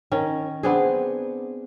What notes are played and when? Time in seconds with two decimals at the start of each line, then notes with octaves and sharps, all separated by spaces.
0.11 D#3 C#4
0.63 B3 C4 D4 G#4